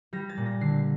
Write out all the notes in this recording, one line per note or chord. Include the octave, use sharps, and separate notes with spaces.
G3 A#6
A6
A#2
A#6
D3 C7